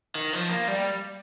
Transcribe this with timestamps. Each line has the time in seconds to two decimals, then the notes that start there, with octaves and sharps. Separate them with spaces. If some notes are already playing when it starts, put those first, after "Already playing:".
0.15 D#3
0.33 F3
0.50 A#3
0.68 G3